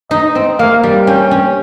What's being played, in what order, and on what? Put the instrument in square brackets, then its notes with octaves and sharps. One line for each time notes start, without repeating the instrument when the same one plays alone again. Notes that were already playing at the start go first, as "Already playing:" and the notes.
[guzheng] D#4 [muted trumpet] D#5
[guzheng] C4
[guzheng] A#3 [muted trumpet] F5
[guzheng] G3
[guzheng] C#4 [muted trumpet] G5
[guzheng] C#4